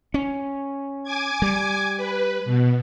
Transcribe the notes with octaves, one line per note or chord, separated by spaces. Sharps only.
C#4
G#5 D6 G#6
G3
B4
B2